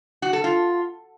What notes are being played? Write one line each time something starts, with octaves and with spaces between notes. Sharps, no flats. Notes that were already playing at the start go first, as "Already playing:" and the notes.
F#4
A4
F4